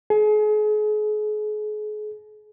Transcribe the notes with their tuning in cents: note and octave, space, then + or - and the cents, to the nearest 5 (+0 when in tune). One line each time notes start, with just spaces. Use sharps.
G#4 +40